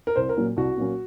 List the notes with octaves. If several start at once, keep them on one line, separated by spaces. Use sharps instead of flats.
A#4
C2 C5
A#4
A#2 F#3 A#3 C#4
C2 F#4
A#2 F#3 A#3 C#4